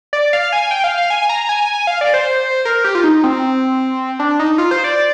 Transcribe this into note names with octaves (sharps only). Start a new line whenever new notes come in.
D5
F5
G#5
G5
F5
F5
G#5
A#5
G#5
F5
D5
C5
A#4
G4
F4
D#4
C4
D4
D#4
F4
C5
D5